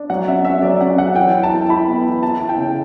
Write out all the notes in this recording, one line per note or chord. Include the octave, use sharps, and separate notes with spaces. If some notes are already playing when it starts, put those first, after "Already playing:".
Already playing: D4
F#3 F#5
C#4 E5
C#4 E5
F#3 D5
C#4 F#5
F#3 F#5
E3 G5
E4
A5
E4
E4 B5
B3
E3
E4 A5
E4
G5
C#3